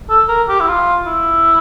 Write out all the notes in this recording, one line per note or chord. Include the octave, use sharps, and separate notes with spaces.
A4
A#4
G4
E4
F4
E4